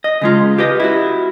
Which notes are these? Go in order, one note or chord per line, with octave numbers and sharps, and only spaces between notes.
D#5
C#3 G#3 F4
G4 B4 D#5
E4 F#4